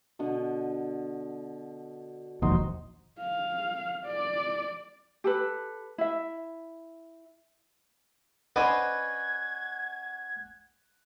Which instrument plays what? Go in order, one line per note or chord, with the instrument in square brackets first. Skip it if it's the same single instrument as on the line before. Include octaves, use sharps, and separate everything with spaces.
[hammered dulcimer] B2 D3
[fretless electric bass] E1 A#1 D#2 [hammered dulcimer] D#4 F#4 C5
[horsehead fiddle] F5
D5
[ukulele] G4 A4 B4
E4 E5
[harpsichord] C#4 D5 D#5 [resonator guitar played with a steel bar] B4 C5 [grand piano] F#5 [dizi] G#6